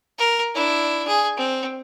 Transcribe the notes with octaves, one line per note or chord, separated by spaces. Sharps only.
A#4
D4 E4
G#4
C4